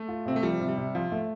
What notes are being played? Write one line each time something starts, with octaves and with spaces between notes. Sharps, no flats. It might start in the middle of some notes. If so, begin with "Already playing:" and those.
Already playing: A3
F4
C3 C4
A3
F3 G3
C3
G3
C3
F3 F4
A3